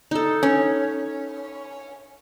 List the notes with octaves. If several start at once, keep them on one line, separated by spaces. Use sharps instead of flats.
D#4 A4
C#4